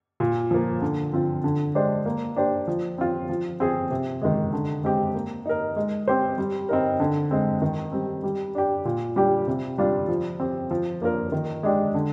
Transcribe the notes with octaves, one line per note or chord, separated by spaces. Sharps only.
A#2
F3 A#3
D3
F3 C4 F4
D3
G#3 D4 G4 C5
A#3
D4 G4 C5
F3
C4 F4
F3
C4 F4 G#4
C3
D#3 G#3
D3
G#3 C4 G4
A#3
D#4 A#4
G#3
C4 G4 C5
G3
C4 D#4 A#4
D3
G#3 C4
D#3
G3 C4
G3
D4 G4
A#2
G3 D4 G4
C3
G3 D4 F4
F3
C4 G4
F3
A#3 D4 F4 A#4
D#3
G#3 D4 G4
D3